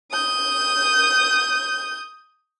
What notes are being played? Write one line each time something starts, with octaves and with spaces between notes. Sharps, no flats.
D#6 G6